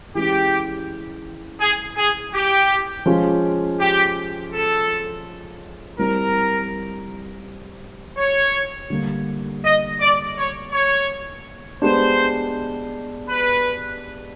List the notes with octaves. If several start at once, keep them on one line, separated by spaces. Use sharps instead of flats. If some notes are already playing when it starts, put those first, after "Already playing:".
E3 G#3 C#4 G4
G#4
G#4
G4
F3 G#3 C#4 F4
G4
A4
G3 C4 E4 A#4
C#5
D3 G3 A#3
D#5
D5
C#5
C#5
G#3 B3 D4 G4 C5
B4